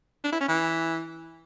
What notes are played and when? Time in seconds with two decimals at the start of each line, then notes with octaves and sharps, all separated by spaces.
0.24 D4
0.32 E4
0.40 C#4
0.48 E3